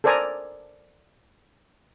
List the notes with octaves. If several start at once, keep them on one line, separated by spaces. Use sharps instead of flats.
A4 A#4 C5 D5 G#5 A#5